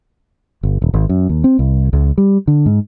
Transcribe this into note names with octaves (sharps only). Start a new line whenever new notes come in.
G1
D#1
G#1
F#2
D#2
C4
C2
C#2
G3
D3
G#2